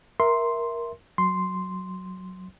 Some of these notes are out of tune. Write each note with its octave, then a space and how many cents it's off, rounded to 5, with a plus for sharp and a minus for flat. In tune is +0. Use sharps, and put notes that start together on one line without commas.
A#4 +10 E5 +0 C6 +0
F#3 +0 C6 -5